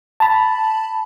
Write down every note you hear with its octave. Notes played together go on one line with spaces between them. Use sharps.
A5 B5